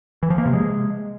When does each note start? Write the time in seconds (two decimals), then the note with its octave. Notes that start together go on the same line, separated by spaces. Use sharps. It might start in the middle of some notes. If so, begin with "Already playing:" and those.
0.23 E3
0.30 F3
0.38 A#3
0.46 C3
0.54 G#3